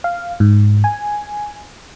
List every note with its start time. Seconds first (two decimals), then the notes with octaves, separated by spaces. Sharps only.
0.04 F5
0.40 G#2
0.84 G#5